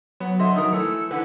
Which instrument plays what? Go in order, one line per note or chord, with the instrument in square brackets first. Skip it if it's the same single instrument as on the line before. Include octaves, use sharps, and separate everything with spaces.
[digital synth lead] F#3 [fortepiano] B3
[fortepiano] D3 D#5 E5 [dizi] C6
[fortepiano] D#3 A#4 [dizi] D#6
[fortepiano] E3 A3 [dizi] E6 [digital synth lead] C#7
[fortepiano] D3 E3 [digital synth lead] B4 [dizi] F#5